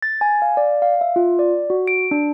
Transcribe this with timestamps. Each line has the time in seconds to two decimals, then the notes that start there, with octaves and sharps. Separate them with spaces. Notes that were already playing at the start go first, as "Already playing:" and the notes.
0.02 A6
0.21 G#5
0.42 F5
0.57 D5
0.82 F5
1.01 E5
1.16 F4
1.39 D5
1.70 F#4
1.88 D7
2.11 D4